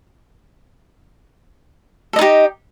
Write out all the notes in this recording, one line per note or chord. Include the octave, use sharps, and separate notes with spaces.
D#4 G4 A4 D#5